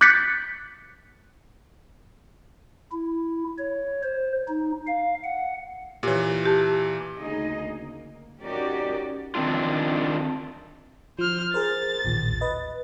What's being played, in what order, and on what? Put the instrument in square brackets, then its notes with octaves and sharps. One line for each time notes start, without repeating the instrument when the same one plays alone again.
[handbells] D6 F#6 G6 A6 B6 C#7
[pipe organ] E4
C#5
C5
D#4
F5
F#5
[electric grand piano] A#2 E3 [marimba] G4 C#5
[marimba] G4 A5
[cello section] D2 C#3 A#3 D#4 G#4 D#5
A#3
C#4 D#4 F#4 G4 A#4 D5
[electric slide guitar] D#3 C4 D4 F4
[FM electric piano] F3 [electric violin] C5 F6
[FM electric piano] G#4 A#4 C5 [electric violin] A6
[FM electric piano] A1 D#2 A#2
B4 D#5